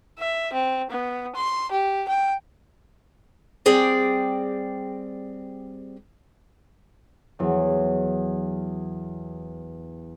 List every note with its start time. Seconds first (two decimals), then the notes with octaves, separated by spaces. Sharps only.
0.19 E5
0.53 C4
0.90 B3
1.36 C6
1.72 G4
2.08 G5
3.66 G3 C4 G#4 D5 G5
7.39 E2 F#3